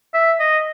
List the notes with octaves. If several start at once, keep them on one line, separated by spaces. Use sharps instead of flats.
E5
D#5